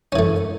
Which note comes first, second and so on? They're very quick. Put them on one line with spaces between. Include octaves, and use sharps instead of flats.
C#4 E3 A3